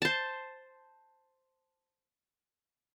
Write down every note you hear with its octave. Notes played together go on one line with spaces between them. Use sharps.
C5 A5